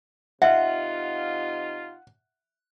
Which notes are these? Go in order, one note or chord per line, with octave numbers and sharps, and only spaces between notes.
C3 D#4 F4 E5 F#5